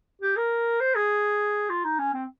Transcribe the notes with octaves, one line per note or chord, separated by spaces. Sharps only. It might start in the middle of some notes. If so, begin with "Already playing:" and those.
G4
A#4
C5
G#4
F4
D#4
C#4
C4